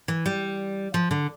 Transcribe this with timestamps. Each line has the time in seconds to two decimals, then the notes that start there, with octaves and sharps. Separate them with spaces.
0.08 E3
0.26 G3
0.94 F3
1.11 D3